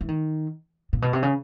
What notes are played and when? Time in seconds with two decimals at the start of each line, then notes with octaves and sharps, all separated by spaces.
0.01 E3
0.08 D#3
0.93 A#2
1.02 B2
1.13 C3
1.23 C#3